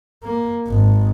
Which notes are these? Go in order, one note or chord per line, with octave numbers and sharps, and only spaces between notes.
A#3
G#1